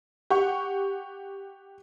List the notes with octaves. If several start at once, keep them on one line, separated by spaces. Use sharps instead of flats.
G4 F#5 C#6